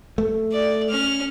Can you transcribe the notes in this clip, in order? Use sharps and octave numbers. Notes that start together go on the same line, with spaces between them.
A3
D5
C#4 F6